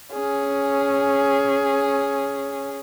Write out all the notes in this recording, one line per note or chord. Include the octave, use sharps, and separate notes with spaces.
C#4 G#4